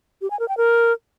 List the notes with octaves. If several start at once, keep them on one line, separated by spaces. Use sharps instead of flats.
G4
G#5
A#4
G5
A#4